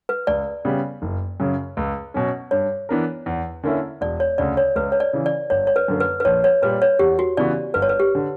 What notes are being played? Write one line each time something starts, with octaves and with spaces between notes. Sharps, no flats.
B4
C#2 D5
C#3 G3 B3
F#1
F#2 C#3
C#2
B2 F#3 C#4
G2 C#5
E3 B3 D4 A#4
E2
D3 A#3 C#4 E4
E1 D5
C#5
D2 C#3 D5
C#5
C#2 B4
C#5
D5
C#3 E3
D5
G1 C#5
C#5
B4
F#2 D3 A#3
B4
B4
A#1 C#5
C#5
A#2 G3 B4
C#5
E2 G4
F#4
C#3 E3 B3 F#4 D5
G1 B4
C#5
B4
G4
D3